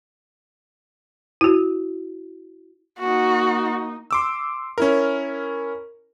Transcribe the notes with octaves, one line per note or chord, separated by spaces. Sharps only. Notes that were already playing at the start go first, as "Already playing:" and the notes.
E4 F#4
A#3 D#4 F#4
C6 D6 E6
C#4 E4 A#4